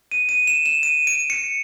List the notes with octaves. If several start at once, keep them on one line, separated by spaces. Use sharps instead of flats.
D#7
D#7
E7
E7
D#7
D7
C#7